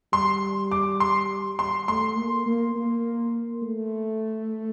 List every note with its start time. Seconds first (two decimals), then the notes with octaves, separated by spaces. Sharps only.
0.13 G3 C6
0.72 D6
1.00 C6
1.59 C6
1.88 A3 C6
2.16 A#3
2.46 A#3
2.76 A#3
3.62 A3